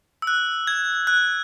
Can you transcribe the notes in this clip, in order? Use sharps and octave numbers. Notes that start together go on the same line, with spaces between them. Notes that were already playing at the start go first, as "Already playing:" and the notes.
E6
F#6
G#6
F#6